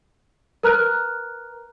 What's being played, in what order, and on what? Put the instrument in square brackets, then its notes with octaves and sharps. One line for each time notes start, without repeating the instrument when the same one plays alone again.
[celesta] A#4 B4 A#5 F6 F#6